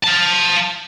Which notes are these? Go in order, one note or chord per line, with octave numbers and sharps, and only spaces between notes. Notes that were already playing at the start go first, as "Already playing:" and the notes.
F5 A5